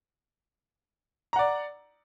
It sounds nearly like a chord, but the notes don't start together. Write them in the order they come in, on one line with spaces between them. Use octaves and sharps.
A#5 F#5 D5